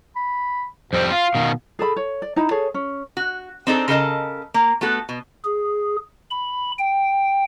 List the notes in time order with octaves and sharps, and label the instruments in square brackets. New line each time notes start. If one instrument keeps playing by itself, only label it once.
[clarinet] B5
[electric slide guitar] F2 G3 C4 [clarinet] C5
[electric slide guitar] F4 [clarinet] F5
[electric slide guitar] B2 D#3
[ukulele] G#4 A4 B5
C#5
D5
D#4 E4 A#5 B5
G#4 A4 C#5
C#4
[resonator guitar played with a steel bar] F#4
C4 D4 D#4 G#4 A4 C5
C#3 A4 A#4 D#5 A5
A#3
A3 B3 F#4 A4
B2
[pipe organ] G#4
B5
G5